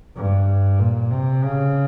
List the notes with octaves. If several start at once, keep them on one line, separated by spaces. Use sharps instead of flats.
G2
A#2
C3
C#3